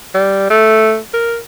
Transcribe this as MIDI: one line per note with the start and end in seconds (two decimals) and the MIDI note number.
0.14 0.48 55
0.50 0.99 57
1.13 1.37 70